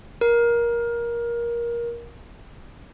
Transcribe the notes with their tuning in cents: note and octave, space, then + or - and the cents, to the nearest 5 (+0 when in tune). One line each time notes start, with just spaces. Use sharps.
A#4 +20